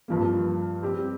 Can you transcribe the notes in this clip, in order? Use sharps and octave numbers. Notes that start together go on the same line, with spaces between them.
G2 F3 A#3
G3 C4 G4